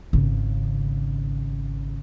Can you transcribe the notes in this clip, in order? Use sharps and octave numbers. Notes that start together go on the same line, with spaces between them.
G#1 C#3